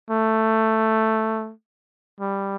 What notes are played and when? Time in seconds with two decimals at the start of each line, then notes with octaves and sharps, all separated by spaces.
0.11 A3
2.20 G3